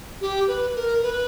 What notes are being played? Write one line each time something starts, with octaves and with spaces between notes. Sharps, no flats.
G4
B4
A#4
B4